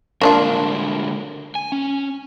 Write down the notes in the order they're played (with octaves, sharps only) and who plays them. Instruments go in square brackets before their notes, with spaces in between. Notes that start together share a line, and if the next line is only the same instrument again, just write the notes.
[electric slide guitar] D3 G#3 A#4 [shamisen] A#3 D4 F4
[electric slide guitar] G#5
C#4